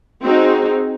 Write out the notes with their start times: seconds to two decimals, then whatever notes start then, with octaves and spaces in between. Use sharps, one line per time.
0.23 C4 D#4 F#4 G#4